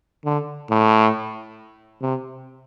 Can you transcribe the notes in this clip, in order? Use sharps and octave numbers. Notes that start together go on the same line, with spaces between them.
D3
A2
C3